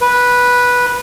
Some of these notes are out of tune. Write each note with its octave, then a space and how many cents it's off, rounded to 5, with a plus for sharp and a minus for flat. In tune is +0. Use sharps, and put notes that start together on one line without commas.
B4 -10